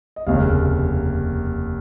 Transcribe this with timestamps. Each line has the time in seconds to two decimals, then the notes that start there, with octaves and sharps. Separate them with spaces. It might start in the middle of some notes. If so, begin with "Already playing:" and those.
0.16 D#5
0.27 F1 D#2 C#3 F5